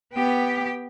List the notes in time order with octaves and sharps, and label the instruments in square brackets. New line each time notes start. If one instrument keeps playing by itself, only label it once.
[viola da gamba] B3 [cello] G4 G5